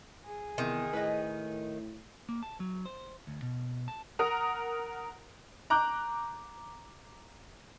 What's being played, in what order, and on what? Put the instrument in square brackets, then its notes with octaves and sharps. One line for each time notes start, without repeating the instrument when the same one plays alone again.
[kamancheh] G#4
[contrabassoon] E2 [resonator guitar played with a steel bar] C3 [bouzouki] D#3
[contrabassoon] A2 [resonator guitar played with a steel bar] B4 D#5
[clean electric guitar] A#3
A5
F#3
C5
D2
B2
A5
[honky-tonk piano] A#4 F#5 A#5 D#6
[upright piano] A#5 D6 F#6 G6